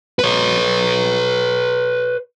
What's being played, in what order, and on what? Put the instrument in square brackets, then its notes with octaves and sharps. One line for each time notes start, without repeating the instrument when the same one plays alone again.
[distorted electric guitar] B4 C#5